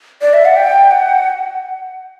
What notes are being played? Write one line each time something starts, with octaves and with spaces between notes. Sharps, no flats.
D5
E5
F#5
G5
F#5